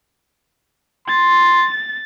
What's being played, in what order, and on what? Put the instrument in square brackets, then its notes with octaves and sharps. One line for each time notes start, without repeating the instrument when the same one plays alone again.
[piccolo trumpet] C6 [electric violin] A6